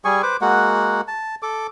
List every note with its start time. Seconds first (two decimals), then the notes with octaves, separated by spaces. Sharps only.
0.05 G3 G#4 G#5 C#6
0.23 B4 C5 D6
0.41 G#3 A#3 F#4 F#5
1.08 A5
1.43 A4 D6